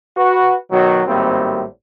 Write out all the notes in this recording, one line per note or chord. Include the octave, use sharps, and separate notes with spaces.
F#4 B4
B2 D#3 F#3
G#1 A2 G3 A#3 C4